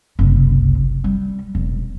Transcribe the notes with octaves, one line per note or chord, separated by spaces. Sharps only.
F#1 C2
G3
E1